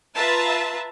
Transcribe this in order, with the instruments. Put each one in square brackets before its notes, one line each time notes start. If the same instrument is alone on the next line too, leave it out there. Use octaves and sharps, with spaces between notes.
[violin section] F4 B4 E5 A5 A#5